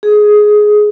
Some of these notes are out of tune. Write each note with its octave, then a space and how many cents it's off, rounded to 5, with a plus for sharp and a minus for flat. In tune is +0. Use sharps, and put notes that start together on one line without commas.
G#4 +10